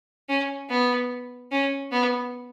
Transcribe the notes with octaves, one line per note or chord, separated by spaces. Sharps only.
C#4
B3
C#4
B3